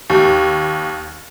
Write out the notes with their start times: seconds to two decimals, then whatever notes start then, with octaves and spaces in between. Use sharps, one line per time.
0.10 D#2